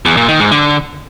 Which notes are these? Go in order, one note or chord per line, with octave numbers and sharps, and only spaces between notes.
E2
A#2
D#3
G#2
D3